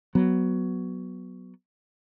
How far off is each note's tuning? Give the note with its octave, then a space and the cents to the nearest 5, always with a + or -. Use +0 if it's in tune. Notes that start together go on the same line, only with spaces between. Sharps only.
F#3 +5 B3 +0